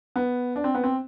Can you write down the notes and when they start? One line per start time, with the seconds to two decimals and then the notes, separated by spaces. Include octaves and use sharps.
0.16 B3
0.56 D4
0.64 C4
0.75 B3
0.84 C4